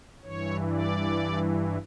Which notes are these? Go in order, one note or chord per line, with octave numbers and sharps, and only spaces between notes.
G2 E3 C#5
D5